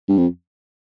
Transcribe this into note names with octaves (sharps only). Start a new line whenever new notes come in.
G2
F2